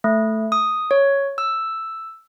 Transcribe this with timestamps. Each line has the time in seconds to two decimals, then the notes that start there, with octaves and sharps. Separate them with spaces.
0.04 A3
0.52 D#6
0.91 C#5
1.38 E6